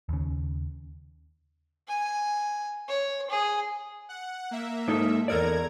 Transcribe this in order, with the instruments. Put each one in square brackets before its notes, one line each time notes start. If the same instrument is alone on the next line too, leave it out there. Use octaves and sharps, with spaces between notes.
[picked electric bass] D#2 C#3
[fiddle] G#5
C#5
G#4
[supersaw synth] F#5
A#3 E5
[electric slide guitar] G#2 D#4 A4
[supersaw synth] E2 A#5 G#6 [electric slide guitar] A4 A#4 D5